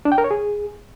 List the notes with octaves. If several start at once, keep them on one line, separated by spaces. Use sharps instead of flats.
D4
G5
A#4
C#5
G#4